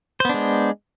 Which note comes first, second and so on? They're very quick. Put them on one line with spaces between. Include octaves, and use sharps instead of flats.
C5 B3 D4 G#3